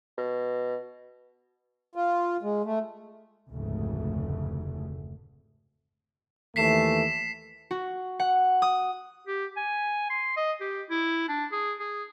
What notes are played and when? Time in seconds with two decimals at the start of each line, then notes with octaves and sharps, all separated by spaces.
0.18 B2
1.96 F4
2.43 G#3
2.65 A3
3.50 F1 D2 G#2 C#3 A3
6.56 D#2 E3 A3 B6 C7 E7
7.71 F#4
8.19 F#5
8.62 D#6
9.27 G4
9.57 G#5
10.10 C6
10.37 D#5
10.61 G4
10.90 E4
11.29 D4
11.52 G#4
11.80 G#4